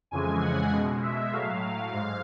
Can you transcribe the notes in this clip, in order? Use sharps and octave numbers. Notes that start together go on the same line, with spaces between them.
F2 C#3 E3 G#3 G#5
F#5
B2 G#3
E5
A2 F#3 F5
G#2